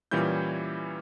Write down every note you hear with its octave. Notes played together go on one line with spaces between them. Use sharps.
A#2 E3 G3 C#4 E4 G6